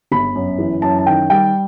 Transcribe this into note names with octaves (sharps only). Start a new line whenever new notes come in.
G1 B5
F#2
E3
F#2 A5
A5
D#3 G5
G3 G5